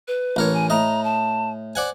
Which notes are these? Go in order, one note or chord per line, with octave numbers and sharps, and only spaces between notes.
B4
A1 A#4 C#5
G#5
A2 D#5 A#5
A5
C5 D5 F#5 G#5